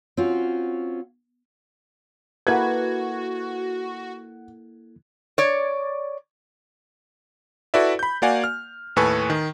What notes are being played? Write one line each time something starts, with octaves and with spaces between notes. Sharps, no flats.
C4 C#4 F4 F#4
A#3 E4 F#4 A4 B4 F#5 G#6
C#5 D5
E4 F#4 A4 B4 D5 E5
B5 G6
A#3 F#4 D5 F5 F#5 G#5
F6
D#2 A2 A4 B4 G#5 C#6
D#3